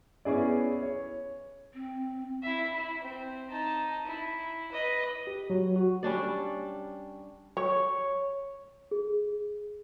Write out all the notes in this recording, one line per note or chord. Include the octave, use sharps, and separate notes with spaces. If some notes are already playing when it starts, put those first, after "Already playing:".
B3 C#4 E4 G#4 D5
C#5
C4
E4 E5
E4
C4
D#4 A5
E4
B4 D#5
G4
F#3
F#4
G3 C#4 D4 D5
C#5
G#4